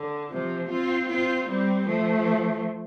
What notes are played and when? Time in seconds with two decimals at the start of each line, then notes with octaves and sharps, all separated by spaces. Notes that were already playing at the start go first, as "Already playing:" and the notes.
Already playing: D3
0.31 C3 F3
0.71 C4 F4
1.10 C4 F4
1.49 G3 C4
1.88 F3 A3